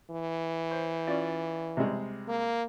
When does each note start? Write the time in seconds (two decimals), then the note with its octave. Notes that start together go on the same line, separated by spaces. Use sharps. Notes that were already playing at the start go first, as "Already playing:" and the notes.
0.10 E3
0.71 C5
1.07 C#4 F4 D5
1.77 C3 G3 G#3
2.28 A#3